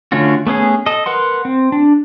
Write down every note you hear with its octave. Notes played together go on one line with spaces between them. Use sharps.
D3 A3 C#4 F4 F#4
A3 B3 C#4 G#4
A4 D#5
A#4 B4 F#5 C6
C4
D4